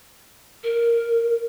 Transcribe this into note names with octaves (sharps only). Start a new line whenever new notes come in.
A#4